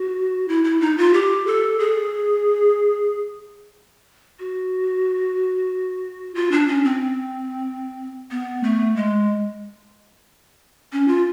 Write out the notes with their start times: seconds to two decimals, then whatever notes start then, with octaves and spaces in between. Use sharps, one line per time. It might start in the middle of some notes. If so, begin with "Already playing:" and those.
Already playing: F#4
0.48 E4
0.64 E4
0.81 D#4
0.98 F4
1.14 G4
1.47 A4
1.79 G#4
4.39 F#4
6.35 F4
6.52 D4
6.68 C#4
6.84 C4
8.31 B3
8.64 A3
8.96 G#3
10.93 C#4
11.08 F4